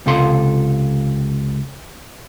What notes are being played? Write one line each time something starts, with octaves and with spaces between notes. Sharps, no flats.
C#2 C3 F4 A4 C6